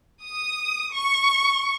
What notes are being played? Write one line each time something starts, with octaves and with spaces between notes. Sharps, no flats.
D#6
C#6